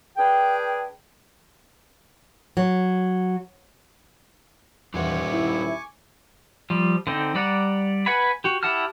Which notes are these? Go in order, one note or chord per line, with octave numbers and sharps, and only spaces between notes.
D4 G#4 B4 G5
F#3
D#1 E2 D4 F4 F#5 G#5 C#6 D6
E4
F3 G3
D3 C4 D#4
G3 D5 F#5 A#5
B4 F#5 G#5 B5
F#4 G4
E4 G4 F#5 A5 F6